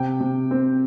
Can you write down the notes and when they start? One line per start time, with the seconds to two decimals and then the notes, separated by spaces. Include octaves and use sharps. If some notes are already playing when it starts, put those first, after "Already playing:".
Already playing: C3 G5
0.20 C3
0.51 C4